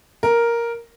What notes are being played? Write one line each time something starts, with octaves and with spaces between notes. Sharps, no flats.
A#4